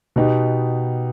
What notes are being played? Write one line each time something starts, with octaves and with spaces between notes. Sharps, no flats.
B2 B3 D#4 G4